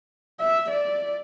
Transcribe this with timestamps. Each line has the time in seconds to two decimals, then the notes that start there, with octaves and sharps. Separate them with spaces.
0.40 E5
0.70 D5